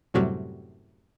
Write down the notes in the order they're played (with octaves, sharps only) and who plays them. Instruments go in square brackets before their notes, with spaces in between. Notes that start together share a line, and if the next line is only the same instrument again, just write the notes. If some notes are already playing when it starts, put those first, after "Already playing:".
[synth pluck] F#2 A2 C3 F#3 G3